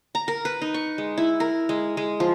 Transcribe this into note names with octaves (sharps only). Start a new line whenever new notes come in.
A#5
A#4
B4
D#4
C#6
G#3
E4
A#4
G#3
G#3
F3